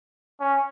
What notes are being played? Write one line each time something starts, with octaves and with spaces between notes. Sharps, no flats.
C#4